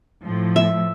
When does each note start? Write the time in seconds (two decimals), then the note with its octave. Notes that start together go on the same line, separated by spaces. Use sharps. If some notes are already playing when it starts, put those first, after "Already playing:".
0.22 A2 F3
0.56 E5